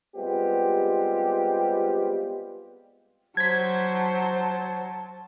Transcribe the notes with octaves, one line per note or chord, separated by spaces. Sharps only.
G3 G#3 B3 C4 F4 G4
F#3 C5 A5 G#6 B6